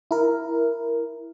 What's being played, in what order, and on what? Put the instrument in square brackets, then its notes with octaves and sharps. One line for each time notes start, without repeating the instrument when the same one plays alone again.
[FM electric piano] E4 A#4